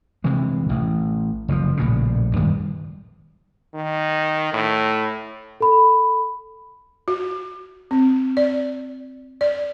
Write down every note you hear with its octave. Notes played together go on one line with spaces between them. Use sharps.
C3 E3 G#3
A1
F#1 C#3 F3
A#1 A2 C#3
G2 D#3 G3 G#3
D#3
A2
A4 B5
F#4
C4
D5
D5